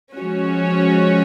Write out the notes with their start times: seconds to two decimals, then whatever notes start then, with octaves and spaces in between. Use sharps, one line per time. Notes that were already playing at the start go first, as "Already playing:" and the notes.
0.17 F3 G#3 C#4 F#4 C#5